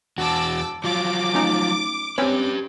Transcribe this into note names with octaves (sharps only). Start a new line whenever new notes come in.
E2 F#4 A5 D6 E6
F3 F#3 F4 D6
A3 C#4 D#4
C4 C#4 G4 B4 C#5